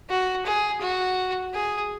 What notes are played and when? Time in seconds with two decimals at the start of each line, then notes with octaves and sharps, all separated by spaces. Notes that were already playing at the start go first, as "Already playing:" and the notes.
0.09 F#4
0.46 G#4
0.81 F#4
1.53 G#4